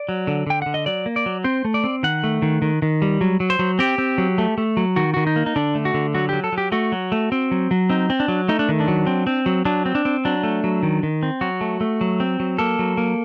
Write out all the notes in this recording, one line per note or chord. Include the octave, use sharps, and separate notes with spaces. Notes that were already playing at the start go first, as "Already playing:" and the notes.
Already playing: D5
F#3
D3
D3 G5
D3 F#5
D#5
F#3 D5
A#3
D5
F#3
C4 C5
A3
D5
C4
D#3 F#5
A3
D#3
D#3
D#3
G3
F#3
F#3
C5
F#3
C4 G4
C4
F#3
A3
A3
F#3
D#3 F#4
D#3 F#4
D#4
A#3
D#4
D3 D4
A3
F#4
D3
F#3 F#4
F#3 G4
A4
F#3
G4
A3 F#4
F#3
A3
C4
F#3
F#3
C4 D#4
C4
D4
F#3
A3 D#4
D4
D#3
D4
F#3
C4
C4
F#3
F#3 D4
C4
D4
C4
F#3 D4
A3
F#3
D#3
D#3
C4
F#3 F#4
A3
A3
F#3
C4
F#3
A#3 A4
F#3
A#3